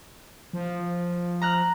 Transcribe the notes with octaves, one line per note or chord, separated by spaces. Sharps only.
F3
A#5 F6 F#6